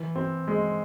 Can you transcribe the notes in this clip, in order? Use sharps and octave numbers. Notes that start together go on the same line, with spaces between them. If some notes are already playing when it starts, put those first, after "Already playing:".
Already playing: E3
C4
G#3